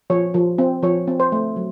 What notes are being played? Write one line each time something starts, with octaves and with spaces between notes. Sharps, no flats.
F3 C#5
F3
C4
F3 C#5
C4
C5
A3
F#3